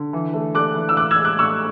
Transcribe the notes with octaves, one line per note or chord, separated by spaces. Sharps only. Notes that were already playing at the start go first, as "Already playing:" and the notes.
Already playing: D3
E3
A3
A3 D6 F#6
E3
E6
A2 D6 F#6
E6 G#6
G#3
D6 F#6
A2 C#6 E6